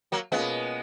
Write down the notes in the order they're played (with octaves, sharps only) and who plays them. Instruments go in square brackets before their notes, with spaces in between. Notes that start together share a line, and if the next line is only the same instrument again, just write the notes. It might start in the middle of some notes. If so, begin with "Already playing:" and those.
[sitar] F#3 A#3
[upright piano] B2 A#3 C#4 F4 [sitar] G#3 B3